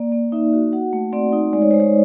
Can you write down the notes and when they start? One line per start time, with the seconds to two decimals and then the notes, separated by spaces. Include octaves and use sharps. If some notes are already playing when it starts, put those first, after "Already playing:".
Already playing: A#3 D5
0.12 A#3
0.32 D#4 E5
0.53 F#4
0.73 F#4 F#5
0.93 A3
1.13 C4 D5
1.33 D#4
1.53 G#3 D5
1.62 C#5
1.71 G#3 C5
1.80 C#5